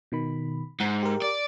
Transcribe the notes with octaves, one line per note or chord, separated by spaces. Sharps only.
B2 D#3 B5
G#2 F#5
G4 A#4
D5